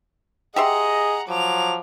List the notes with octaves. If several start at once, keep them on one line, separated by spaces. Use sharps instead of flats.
G4 G#4 D#5 E5 F#5 A#5 C6
F3 F#3 D6 F7